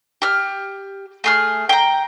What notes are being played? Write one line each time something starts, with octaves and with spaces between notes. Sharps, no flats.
G4 F6
A3 G#4 F6
G5 A#5